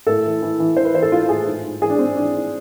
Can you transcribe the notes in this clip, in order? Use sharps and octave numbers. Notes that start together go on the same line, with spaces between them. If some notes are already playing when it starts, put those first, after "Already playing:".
A2 A4
E3
E3
E3
E3 C5
B4
E3 C5
A4
E3 F4
A2 G#4
G#2
G#2
E3 G#4
D4
G#2 C4
E3 D4
G#2